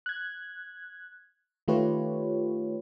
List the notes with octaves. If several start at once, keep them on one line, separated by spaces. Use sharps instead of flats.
F#6 G#6
D#3 A3 F4 G4 B4 C#5